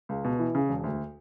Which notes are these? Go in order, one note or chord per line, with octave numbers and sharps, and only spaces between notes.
C#2
B2
E3
C#3
E1
D2